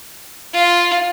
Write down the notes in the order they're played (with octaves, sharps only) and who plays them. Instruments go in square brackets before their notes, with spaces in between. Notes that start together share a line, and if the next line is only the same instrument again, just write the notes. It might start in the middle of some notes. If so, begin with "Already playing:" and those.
[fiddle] F4